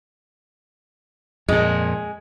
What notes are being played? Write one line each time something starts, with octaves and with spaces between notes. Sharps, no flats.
F2 A#2 G#3